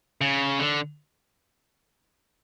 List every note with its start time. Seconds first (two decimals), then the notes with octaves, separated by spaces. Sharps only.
0.21 C#3
0.59 D3